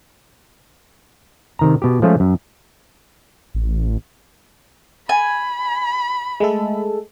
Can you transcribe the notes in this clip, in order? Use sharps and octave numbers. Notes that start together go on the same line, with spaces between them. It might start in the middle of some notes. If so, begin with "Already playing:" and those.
C3 D#3 A#5
B2 G4
F3 G#3 A3 C#4 F4
F#2
A1
G#5 B5
G#3 A3 A4